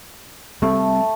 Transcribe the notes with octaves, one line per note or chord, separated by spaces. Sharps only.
G3 A3 C4 A4